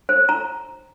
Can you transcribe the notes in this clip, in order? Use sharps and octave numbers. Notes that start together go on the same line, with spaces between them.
C5
A#5